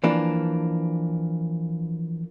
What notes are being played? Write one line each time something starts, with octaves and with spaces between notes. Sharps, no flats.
E3 F3 A#3 D4